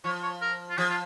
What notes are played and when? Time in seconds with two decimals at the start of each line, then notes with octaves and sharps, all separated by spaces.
0.04 F3 C#5
0.23 C#5
0.41 A#4
0.70 F4
0.78 F3 G#4
0.90 F4